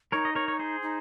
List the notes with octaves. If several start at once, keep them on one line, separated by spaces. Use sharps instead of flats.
D#4 A#4 C#5
D#5
A#4 C#5
C#5
G#4 C5
D#4